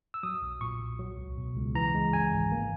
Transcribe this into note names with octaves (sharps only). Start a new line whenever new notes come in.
E6
F#3 D#6
B1
A#2 C#6
B1
F#3
C#2
B2
C#2
E3 A#5
G#3
F#2 G#5
G#1
A#3